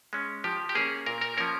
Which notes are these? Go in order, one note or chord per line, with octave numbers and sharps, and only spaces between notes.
G#3 C#4
F3 G4
G4
A#3 C#4 G#4
A#2 A#4
A#4
F3 A#3 C#4 A#4